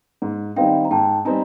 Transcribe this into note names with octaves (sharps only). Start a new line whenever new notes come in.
G#2
D#3 G3 C4 D#4 F5 G5
A#5
G#2 G5 A5
G3 C4 D#4 G#5 A#5